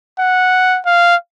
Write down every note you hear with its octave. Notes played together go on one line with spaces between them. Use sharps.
F#5
F5